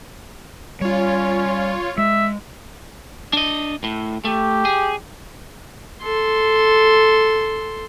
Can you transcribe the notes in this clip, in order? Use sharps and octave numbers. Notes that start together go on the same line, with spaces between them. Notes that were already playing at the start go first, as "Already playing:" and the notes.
G3 C#4 F4 C#5
G#3 E5
D4 D#5
A2
A3 G4
G#4
A4 C6